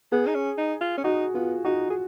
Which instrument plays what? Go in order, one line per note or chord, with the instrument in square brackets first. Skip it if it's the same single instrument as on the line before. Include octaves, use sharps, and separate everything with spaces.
[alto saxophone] B3 [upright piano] G#4
[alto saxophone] D#4
C#4
D#4
F4
C#4
[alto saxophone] D#4 [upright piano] F#4
[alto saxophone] B3 [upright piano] F4
[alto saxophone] D#4 [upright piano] F#4
[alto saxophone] G#4